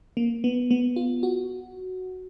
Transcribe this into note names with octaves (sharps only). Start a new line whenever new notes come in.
A#3
B3
B3
F4
F#4